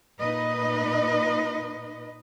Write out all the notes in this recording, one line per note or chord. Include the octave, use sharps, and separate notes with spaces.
A#2 D#4 B4 D#5